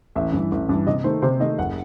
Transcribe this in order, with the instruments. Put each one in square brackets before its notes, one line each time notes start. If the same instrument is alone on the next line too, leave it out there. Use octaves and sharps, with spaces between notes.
[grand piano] A1 [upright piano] E5
[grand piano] G2 E3
A1
G2 E3
[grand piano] C3 [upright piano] D#5
[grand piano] D#3 A3 [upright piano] C5
[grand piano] C3 [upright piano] C5
[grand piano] D#3 A3 [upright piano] D#5
[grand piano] F#1 [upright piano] F#5